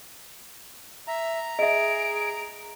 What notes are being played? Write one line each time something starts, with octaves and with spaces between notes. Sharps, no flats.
E5 A#5
G#4 D#5 E5 D7